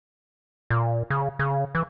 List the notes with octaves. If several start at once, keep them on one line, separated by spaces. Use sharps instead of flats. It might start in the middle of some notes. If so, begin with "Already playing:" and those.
A#2
C#3
C#3
E3